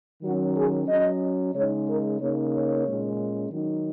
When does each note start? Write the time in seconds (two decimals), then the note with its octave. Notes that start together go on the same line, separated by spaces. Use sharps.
0.23 D#3 F#3 C#4 F#4
0.56 G#4
0.88 F#3 C#4 D#5
1.54 C#3 G#3 D#4 C#5
1.86 A#4
2.20 C#3 A#3 D#4 C#5
2.53 C#5
2.85 A#2 G#3 C#4
3.51 D#3 F#3 D#4